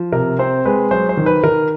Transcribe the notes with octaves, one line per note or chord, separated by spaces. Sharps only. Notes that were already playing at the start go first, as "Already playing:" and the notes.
Already playing: F3
C3 A#4
C4 C5
G#3 B4
F#3 C5
C5
D#3
B4
D#3 A#4